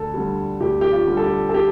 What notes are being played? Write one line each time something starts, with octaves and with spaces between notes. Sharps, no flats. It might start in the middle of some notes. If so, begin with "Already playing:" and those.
Already playing: D2 A4
D3 G3
D2 G4
G4
F4
D3 G3
A4
G4
A4
G4